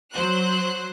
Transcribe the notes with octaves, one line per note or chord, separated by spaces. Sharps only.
F#3 C5 F#6